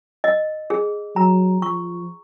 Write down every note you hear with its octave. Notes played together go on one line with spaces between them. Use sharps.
D#5
G#4
F#3 A#5
F3 C#6